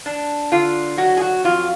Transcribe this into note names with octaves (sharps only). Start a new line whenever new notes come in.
D4
D3 F4
F#3 F#4
G#4
F#4
F2 F4